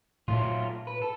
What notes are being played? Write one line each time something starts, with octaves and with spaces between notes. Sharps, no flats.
A#2 F#3 A3 F4
B4
A4